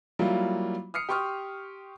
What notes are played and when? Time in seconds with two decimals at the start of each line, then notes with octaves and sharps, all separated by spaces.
0.19 F#3 G3 A#3 E4 F4
0.94 D#6 F6 C7 C#7
1.09 G4 C6 C#6 D#6 F6